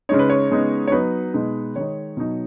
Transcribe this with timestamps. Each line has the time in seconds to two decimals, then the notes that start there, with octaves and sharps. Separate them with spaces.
0.09 C#3 G#3 D#4 C#5
0.19 B4
0.30 C#5
0.51 C#3 G#3 B3 D#4
0.87 C#5
0.92 F#3 B3 D#4 B4
1.34 B2 G#3 D#4
1.75 D#3 G#3 D#4 C#5
2.17 B2 F#3 D#4